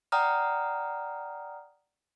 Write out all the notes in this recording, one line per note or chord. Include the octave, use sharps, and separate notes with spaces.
D5 F#5 G5 A#5 D#6 F6